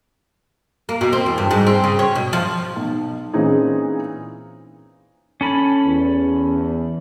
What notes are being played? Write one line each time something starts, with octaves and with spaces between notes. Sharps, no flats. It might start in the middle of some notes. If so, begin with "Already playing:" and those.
A#3
B2
C4
E2
G2
G#2
C4
C#3
C#5
B2
F3
B1
A#2 E3 C4 C#4 D#4 G#4
C#4 A4 B5
E2